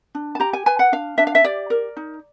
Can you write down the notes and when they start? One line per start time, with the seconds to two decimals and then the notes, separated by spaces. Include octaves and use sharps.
0.15 D4
0.35 A5
0.40 G4 A#5
0.53 G#5
0.66 B4 G#5
0.79 F#5
0.92 D4 F5
1.18 D4 E5
1.27 F5
1.35 E5
1.44 G4 D5
1.70 A#4
1.97 D#4